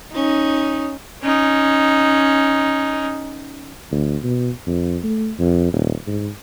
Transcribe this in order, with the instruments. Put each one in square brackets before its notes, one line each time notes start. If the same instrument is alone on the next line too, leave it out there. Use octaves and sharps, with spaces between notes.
[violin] C#4 [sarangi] D#4
[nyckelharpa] C#4 D#4
[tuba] D2
B2
F2
A3
F2
D#1
G#2